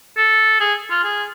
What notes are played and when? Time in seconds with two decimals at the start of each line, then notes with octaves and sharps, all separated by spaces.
0.17 A4
0.60 G#4
0.90 F4
1.04 G#4